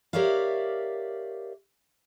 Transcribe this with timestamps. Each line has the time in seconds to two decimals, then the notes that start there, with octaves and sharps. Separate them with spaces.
0.13 G4 A#4 C#5 D5 E5 F5